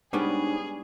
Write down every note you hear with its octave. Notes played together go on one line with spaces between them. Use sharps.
G#2 G3 B3 C#4 D4 G#4